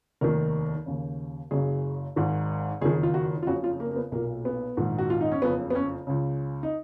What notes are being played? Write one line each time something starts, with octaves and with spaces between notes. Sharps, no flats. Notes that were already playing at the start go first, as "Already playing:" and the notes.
F1 D#2 D#3 A#4
D#2 C#3
F#1 F#2 C#3 G#4
G#1 G#2 D#3
F#1 F2 D#3 G#4
F4
F#4
F4
F#1 F2 C#3 F#4
F4
A#3
A#3
B3
B1 A#2 A#3
B3
A#1 G#2 D#3
F#4
F4
D#4
C#4
F#1 F2 C#3 B3
B3
C#4
C#2 C#3
D#4